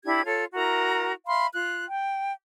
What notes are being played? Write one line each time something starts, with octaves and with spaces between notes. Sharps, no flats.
D4 E4 G4 G#6
F4 A4 C#5
E4 F#4 A#4 A#5
E5 F5 B5 C6
F4 F#6
G5